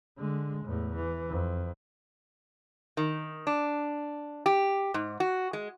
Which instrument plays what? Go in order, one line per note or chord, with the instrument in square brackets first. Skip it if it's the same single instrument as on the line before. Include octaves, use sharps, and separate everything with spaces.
[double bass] D3 G#3
E2 A2
E3
F2
[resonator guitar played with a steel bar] D#3
D4
G4
G#2
F#4
G#3